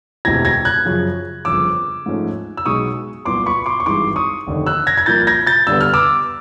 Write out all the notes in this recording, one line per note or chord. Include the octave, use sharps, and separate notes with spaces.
E1 D2 C3 E3 G#6 A#6
G#6 A#6
F#6 G#6
F#2 C#3 F3
G1 F2 C#3 F3 D6 E6
G#2 F3 A3 C#4
E6
B1 B2 G#3 C#6 D#6
C2 A#2 F#3 B3 C6 D6
B5 C#6
C6 D6
C#6
G#1 G2 E3 G#3 C6 D6
C#6 D#6
F1 D#2 D3
E6 F#6
G#6 A#6
G#6
C2 A#2 F3 A#3 G6 A6
G#6 A#6
G6 A6
G2 D3 G3 B3 E6
F6
D6 E6